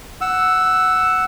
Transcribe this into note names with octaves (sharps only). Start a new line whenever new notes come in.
F#5 E6